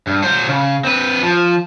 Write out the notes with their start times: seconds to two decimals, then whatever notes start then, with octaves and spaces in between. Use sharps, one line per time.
0.07 G2
0.23 F#3 C5
0.48 C#3
0.84 C4 B4
1.23 F3